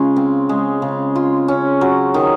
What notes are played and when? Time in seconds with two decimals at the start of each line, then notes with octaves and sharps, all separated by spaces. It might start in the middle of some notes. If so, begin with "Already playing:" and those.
Already playing: C#3 G#3 F4
0.16 C4
0.49 G#3
0.82 C#3
1.15 F4
1.48 C#4
1.81 F#3
2.14 D#3